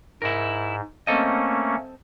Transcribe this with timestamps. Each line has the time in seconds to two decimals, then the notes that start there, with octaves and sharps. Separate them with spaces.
0.22 G#2 E4 A#4
1.07 A3 A#3 C4 C#4 A4 D#5